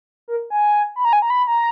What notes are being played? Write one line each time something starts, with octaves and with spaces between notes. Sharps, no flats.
A#4
G#5
B5
A#5
G#5
A#5
B5
A#5